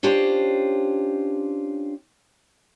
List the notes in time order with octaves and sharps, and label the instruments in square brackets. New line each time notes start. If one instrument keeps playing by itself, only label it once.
[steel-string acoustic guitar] C#4 D4 F4 G4 C5